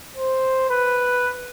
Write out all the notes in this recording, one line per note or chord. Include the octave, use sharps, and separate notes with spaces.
C5
B4